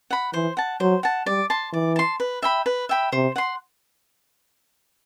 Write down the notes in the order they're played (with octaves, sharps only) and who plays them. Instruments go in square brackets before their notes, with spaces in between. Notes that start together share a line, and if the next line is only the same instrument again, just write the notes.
[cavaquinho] F#5 B5
[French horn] E3 [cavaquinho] C5
[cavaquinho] F#5 A5
[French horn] F#3 [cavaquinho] C5
[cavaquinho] F#5 A5
[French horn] G3 [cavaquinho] D5
[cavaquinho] A5 C6
[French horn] E3 [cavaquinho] D5
[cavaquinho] A5 C6
B4
E5 G5 B5
B4
E5 G5 B5
[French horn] C3 [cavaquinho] C5
[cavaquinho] F#5 C6